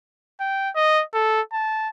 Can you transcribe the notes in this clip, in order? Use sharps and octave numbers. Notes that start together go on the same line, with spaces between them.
G5
D#5
A4
A5